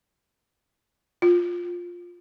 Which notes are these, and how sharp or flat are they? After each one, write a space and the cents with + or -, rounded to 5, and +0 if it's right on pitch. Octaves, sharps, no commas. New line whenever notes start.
F4 +10